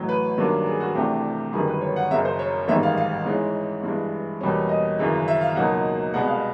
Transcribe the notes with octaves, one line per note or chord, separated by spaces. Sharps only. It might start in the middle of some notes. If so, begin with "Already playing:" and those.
Already playing: A1 A2 F#3
B4
G2 D#3 F#3 A#3 D4
G#4
F#4
C2 C3 E3 A3 D4 G4
G1 F#2 D#3 G3 G#4
B4
C#5
F#5
F#1 F#2 C#3 E5
C5
C#5
A1 G#2 D#3 G3 E5
F5
F5
G#2 E3 G#3 C#4
G2 E3 G#3
E2 B2 G3 A#3 C#4
D#5
G#1 F#2 C#3 E3
E5
F5
C#2 B2 F#3 A#3 D#4 F#5
C2 B2 G#3 B3 F#5
F5